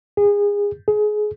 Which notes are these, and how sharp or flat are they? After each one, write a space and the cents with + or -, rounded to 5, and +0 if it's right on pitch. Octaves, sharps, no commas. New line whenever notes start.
G#4 -25
G#4 +25